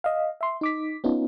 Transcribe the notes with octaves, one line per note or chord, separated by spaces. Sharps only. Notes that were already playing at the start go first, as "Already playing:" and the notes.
D#5 F5
E5 C6
D#4 D6 B6
B3 C#4 D#4 F4